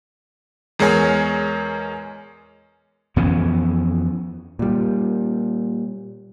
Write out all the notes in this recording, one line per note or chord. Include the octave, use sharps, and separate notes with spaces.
E2 G#3 A#4 C#5 G#5
F2 E3 B3 C#4
A#2 G3